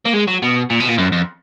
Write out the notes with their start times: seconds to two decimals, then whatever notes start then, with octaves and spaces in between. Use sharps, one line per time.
0.06 A#3
0.14 G#3
0.28 F#3
0.43 B2
0.70 A#2
0.80 B2
0.88 A#2
0.98 F#2
1.12 F2